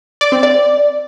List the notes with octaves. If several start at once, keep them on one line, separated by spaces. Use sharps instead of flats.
D5
C4
D5